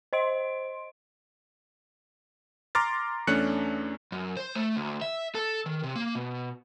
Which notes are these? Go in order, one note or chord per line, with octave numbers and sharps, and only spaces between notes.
C5 D#5 C6 D7
A#5 C6 D6 F6 A6
E2 A3 C#4 D4 F#6 C#7
F#2
C5
A3
D2
E5
A4
D#3
C3
A#3
B2